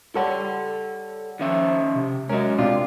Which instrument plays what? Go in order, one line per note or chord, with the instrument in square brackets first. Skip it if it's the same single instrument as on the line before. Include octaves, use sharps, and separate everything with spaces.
[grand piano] G3 C#5 A5 [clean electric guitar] A4 F#5
[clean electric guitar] D#3 C#4 E5 [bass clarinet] F3
[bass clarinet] C3
[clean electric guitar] F#3 C#4 [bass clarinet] G#3 [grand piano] A#4 D#5
[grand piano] C3 D4 [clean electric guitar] F4